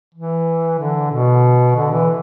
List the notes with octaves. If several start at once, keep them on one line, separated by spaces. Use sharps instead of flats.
E3
D3
B2
D3
E3